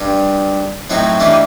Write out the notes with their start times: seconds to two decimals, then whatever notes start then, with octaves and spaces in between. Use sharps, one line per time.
0.01 G2
0.90 A2 F#3 C4 D#4 F#4 C#6
1.20 E3 A3 A#3 D4 D#4 G4